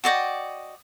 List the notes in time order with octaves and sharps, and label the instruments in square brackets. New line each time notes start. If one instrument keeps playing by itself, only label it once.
[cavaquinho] F#4 D5 D#5 G5